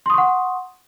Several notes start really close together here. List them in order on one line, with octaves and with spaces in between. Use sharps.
C6 D#6 C#6 F#5